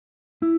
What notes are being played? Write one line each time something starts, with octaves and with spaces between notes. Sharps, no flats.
E4